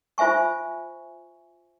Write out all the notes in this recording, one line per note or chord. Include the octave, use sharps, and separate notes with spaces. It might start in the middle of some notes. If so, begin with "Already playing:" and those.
F4 C5 E5 G#5 C#6